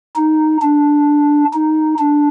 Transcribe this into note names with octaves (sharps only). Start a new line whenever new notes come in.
D#4
D4
D#4
D4